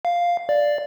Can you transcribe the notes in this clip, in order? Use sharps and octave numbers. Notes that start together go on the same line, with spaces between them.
F5
D5